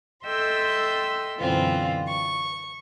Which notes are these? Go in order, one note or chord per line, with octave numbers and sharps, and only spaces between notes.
A4 D#5 E5 G5 C6 E6
F#2 B2 D3 E3 C4 F4
C#6